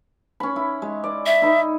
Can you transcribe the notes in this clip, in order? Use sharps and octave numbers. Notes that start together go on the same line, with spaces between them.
C#4 B5
E4
G#3
D5
E5
D#4 E4